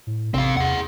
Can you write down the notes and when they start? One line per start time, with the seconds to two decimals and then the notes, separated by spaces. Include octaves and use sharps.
0.07 A2
0.34 A1 C3 C4 F5
0.57 E2 G#4 F#5